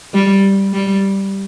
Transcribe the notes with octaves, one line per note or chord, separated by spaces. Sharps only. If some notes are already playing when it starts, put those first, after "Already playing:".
G3
G3